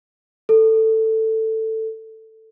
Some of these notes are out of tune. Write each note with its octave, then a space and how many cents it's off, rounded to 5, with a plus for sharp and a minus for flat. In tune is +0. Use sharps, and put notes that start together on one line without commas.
A4 +10